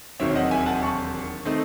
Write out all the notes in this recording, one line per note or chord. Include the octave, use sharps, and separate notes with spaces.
E1 D#2 D#3 F#3 C4 C#5 E5
D#5 F#5
E5 G#5
F#5 A5
A5 C#6
D#3 A3 C4 D#4